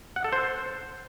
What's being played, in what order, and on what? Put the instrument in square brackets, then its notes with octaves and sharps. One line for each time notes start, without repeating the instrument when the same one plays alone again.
[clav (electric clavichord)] F#5
A4
C5